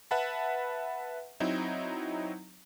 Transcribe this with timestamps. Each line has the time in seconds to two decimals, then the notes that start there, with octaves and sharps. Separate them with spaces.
0.11 B4 E5 F#5 A5 B5
1.40 F#3 C4 D#4 E4